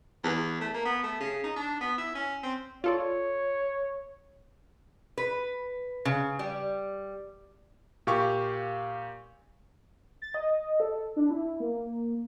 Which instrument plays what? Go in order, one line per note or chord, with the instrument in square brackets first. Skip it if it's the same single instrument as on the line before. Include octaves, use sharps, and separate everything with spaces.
[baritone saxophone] E2
A3
A#3
B3
A3
C#3
D#4
D4
B3
E4
C#4
C4
[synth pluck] F4 A4 D5 [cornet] C#5
[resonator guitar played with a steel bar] B4
C#3
G3
[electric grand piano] A#2 G4 F5 C#6
[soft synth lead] A6
D#5
A4
D4
E4
A#3